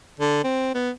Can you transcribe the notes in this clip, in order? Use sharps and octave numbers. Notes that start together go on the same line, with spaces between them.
D3
C4
B3